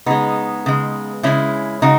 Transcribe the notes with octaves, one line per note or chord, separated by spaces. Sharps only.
C#3 G#3 B3 D#4
C#3 G#3
C#3 G#3 C#4 E4
C#3 G#3 D#4 F#4